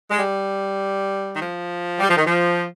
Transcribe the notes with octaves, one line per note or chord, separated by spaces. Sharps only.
G#3
G3
D#3
F3
G3
F3
D#3
F3